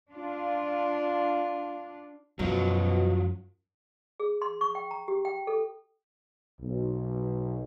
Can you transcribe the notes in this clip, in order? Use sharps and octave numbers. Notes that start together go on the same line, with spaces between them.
D4 F4
F#2 B2 F3 F#3
G#4
C6
C#6
G5
A#5
G4
G5
A4
B1